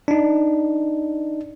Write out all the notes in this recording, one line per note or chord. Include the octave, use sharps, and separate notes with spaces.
D4 D#4